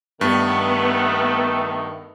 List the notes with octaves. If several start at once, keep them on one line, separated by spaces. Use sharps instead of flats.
G2 D#3 A3 B3